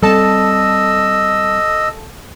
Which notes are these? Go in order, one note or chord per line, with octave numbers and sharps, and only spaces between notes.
G3 G#3 C4 A4 D#5 A5 E6